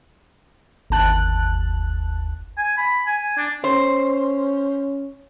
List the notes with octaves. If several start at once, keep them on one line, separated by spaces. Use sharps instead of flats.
G1 D#2 A5 F#6
G#5
B5
G#5
D4
C#4 C5